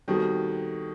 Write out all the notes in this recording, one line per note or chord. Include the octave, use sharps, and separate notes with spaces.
B2 D#3 G3 C4 F#4 A4